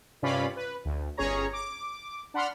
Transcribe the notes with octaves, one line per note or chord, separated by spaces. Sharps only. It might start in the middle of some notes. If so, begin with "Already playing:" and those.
G2 C3 C#4 F4 D5 B5
B4
D2
G1 C#4 G#4 C#5 A#5
D6
D4 F#5 B5 C6 F6